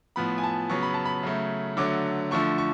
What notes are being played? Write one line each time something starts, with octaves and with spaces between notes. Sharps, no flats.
A2 F3 B3 B5
G#5
A5
C#3 F#3 B3 C#6
B5
A5
B5
C#3 F#3 A3
D3 F#3 A3 D6
D3 F3 A3 C#6
C#6